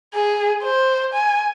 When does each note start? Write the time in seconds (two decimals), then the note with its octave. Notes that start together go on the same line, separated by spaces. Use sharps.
0.14 G#4
0.63 C5
1.14 G#5